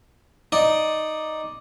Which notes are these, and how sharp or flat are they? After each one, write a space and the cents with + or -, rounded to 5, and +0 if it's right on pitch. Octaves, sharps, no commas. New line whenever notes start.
D#4 +0 D5 +0